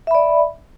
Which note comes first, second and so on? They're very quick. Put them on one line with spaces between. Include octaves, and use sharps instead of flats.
E5 B5 D5